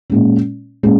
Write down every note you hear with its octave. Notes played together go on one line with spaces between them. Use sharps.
A#2 G#3 C#4
A#2 G#3 C#4